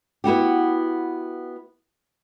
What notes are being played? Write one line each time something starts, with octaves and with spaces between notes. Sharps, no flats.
B3 E4 F#4 G4